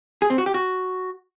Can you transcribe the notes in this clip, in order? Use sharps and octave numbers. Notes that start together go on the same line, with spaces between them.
G#4
C4
F#4
G4
F#4